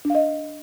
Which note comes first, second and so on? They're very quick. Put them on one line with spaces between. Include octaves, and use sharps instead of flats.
D4 F5 D#5